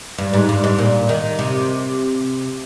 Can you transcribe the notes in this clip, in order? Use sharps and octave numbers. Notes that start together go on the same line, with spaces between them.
G2
G#2
G2
G#2
A#2
D#3
C3